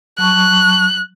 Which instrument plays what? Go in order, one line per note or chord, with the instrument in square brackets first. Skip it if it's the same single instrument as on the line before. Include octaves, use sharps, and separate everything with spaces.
[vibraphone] F#3 A5 C#6 [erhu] F#6